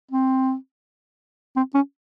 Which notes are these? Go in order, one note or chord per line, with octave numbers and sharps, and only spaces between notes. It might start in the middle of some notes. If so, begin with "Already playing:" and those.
C4
C4
C#4